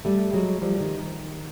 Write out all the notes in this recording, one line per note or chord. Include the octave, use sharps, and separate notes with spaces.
G3 A3
F#3 G#3
F3 G3
D#3
D#3